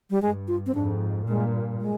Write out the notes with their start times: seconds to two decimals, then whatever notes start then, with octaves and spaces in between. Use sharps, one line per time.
0.10 G3
0.21 G2 G#3
0.48 F4
0.66 C4
0.75 F2 G#2 D4
1.27 G2 A#2 G#3
1.81 G#3